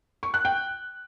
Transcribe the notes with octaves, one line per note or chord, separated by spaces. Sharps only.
C#6
F#6
G5